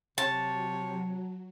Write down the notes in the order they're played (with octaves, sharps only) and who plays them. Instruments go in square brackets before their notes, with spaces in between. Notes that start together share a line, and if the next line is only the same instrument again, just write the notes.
[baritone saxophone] C3 [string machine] F#3 [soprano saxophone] C#5 [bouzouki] A5